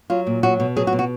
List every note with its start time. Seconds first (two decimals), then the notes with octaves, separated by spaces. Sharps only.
0.10 F#3 F4
0.27 A#2
0.43 F#3 F#4
0.60 B2
0.76 F#3 G#4
0.87 F#4
0.93 B2
0.99 F#4